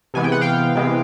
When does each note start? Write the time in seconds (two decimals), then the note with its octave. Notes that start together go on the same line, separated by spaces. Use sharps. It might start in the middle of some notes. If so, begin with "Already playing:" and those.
0.14 C3 E3 G#3 B3 G#5
0.24 G5
0.32 F#5
0.41 F5 G5
0.75 C3 E3 G#3 B3